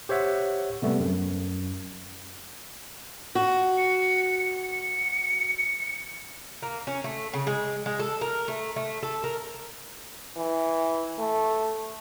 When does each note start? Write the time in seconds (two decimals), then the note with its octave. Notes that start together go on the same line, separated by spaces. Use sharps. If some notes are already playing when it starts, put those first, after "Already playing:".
0.09 G4 C5 C#5 E5 F#5
0.82 C3 G3 A3 B3
0.99 F#2
3.35 F#4
3.78 C#7
4.72 C#7
6.62 A#3
6.87 C#4
7.04 A3
7.33 C#3
7.47 G#3
7.86 G#3
7.99 A4
8.21 A#4
8.48 A3
8.76 A3
9.03 A4
9.24 A#4
10.37 E3
11.19 A3